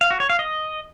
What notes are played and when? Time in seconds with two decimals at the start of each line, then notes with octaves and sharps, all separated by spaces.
0.01 F5
0.11 F#4
0.20 C#5
0.30 F5
0.39 D#5